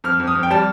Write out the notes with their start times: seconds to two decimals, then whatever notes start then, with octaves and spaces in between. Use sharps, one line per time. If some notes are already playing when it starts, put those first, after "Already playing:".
0.04 F2 F6
0.20 F2
0.27 D#6
0.35 F2
0.43 G5
0.51 G3 A5